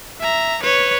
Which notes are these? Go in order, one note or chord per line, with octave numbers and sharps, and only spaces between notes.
E5 A#5
B4 C#5